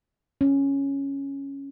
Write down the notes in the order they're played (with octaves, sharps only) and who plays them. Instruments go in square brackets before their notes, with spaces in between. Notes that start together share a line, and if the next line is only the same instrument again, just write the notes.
[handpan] C#4